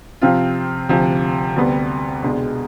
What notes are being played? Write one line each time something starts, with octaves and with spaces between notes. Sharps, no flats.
C3 F3 C4 F4
D2 C3 F3
D2 C3 G3 B3
C2 B2 G#3 D4 G#4